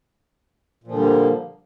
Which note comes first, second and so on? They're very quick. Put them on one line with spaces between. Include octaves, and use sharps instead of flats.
A#2 F3 D3 G3 A#3